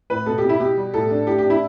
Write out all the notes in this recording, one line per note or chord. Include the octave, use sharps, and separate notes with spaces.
A2 B4
B2 A4
B2 G4
E4
B2 G4
G3
A2 A4
D4
A2 G4
G4
D4
E4